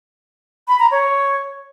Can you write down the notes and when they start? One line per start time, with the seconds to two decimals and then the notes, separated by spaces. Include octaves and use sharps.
0.68 B5
0.80 A#5
0.91 C#5